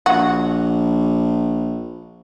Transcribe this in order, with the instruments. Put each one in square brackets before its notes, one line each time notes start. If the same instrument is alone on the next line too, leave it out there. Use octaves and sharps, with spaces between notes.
[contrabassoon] A#1 [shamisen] F#4